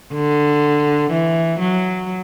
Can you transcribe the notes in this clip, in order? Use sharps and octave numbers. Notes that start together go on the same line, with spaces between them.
D3
E3
F#3